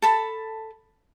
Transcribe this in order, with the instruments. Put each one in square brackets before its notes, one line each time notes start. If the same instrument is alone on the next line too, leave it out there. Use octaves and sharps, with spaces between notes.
[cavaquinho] A4 A5 B5